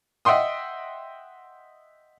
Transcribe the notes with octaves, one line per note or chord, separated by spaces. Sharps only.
D#5 E5 F#5 G5 C6 D#6